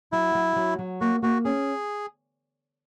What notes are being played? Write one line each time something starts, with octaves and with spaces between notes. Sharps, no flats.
F#3 E4
F#3
F#3
F#3
A#3 F#4
A#3 F#4
C#4 G#4